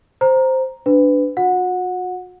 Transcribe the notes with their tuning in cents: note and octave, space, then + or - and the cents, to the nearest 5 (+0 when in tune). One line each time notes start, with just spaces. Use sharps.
C5 +0 A#5 +0
D4 -5 B4 +25
F#4 -40 F#5 -20